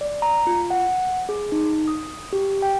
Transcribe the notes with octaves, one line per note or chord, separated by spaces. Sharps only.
D5
A#5
F4
F#5
G#4
D#4
D#6
G4
G5